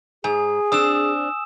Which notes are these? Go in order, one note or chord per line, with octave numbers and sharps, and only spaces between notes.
G#2 G#4 G#5
C4 D4 D#6 E6 E7